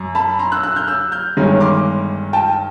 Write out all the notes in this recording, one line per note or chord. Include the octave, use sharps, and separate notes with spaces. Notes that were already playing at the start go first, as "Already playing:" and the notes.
Already playing: F#2
A5 B5
A#5 C6
E6 F#6
E6 F#6
F6 G6
E6 F#6
F6 G6
G1 G2 D#3 G#3 C#4
C6 D6
G5 A5